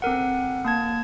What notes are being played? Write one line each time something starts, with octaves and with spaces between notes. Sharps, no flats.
C4 A4 A#4 F#5
A#3 A5 G#6